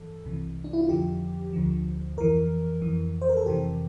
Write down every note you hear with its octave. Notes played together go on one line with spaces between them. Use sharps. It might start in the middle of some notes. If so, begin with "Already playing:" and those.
Already playing: G2 E3 A4
C2 C3 E3
D4
E4
F4
F2 D3 F3 G4
D2 D3 F3
F2 E3 A#4
F2 E3
C5
A#4
A4
F2 C3 E3 G4